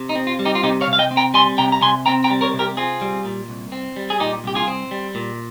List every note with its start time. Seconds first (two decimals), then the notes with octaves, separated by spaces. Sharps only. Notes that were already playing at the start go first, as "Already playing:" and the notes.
Already playing: C3
0.09 D#4
0.15 C4
0.27 F4
0.39 G3
0.45 D#4 G4
0.55 F4
0.63 C3 D#4 G4
0.81 C#5 F5
0.87 C3
0.93 F5
0.99 D#5 G5
1.11 C4
1.17 G5 A#5
1.34 G3 G#5 C6
1.58 C3 G5 A#5
1.72 A#5
1.82 C3 G#5 C6
2.06 C4 G5 A#5
2.24 G5 A#5
2.30 G3
2.41 A#4 C#5
2.53 C3
2.59 G4 A#4
2.77 C4 F4 G#4
3.01 G3
3.25 A#2
3.48 C2
3.72 C4
3.96 G3
4.10 G#4
4.20 A#2 D#4 G4
4.44 C2 G4
4.55 F4 G#4
4.68 C4
4.91 G3
5.15 A#2